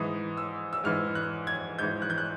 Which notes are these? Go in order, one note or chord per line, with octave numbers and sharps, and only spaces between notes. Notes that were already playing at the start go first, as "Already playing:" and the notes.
Already playing: G#2 E3 D#6
E6
E6
G#2 E3 F6
F#6
G#6
G#2 E3 G6
F#6
G6
F#6